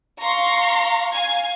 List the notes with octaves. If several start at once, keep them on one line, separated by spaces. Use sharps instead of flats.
F5 A#5 C6 C#6
F5 G#5 G#6